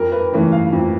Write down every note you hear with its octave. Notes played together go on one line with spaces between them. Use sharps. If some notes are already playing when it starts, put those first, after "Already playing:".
Already playing: F2 A#4
B4
C#3 E3 A3 C#4
F5
F2